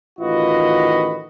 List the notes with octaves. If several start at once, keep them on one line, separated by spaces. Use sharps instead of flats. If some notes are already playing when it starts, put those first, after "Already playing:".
A1 D#3 F4 F#4 B4 D#5